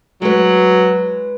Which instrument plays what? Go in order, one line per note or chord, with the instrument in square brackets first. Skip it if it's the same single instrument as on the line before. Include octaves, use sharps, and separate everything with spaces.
[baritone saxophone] F#3 [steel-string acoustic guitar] G#3 B4